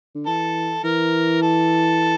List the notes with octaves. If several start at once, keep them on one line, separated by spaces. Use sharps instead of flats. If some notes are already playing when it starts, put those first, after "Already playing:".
D3
E3 A4
E3 A#4
A4